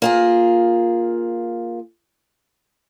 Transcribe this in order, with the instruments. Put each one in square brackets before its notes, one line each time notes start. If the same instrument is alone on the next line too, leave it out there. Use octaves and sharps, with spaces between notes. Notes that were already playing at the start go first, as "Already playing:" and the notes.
[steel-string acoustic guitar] A#3 F4 G#4